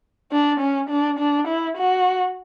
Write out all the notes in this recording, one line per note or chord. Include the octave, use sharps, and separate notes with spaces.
D4
C#4
D4
D4
E4
F#4